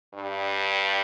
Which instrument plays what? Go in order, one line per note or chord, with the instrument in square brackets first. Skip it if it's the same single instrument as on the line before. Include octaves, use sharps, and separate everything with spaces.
[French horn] G2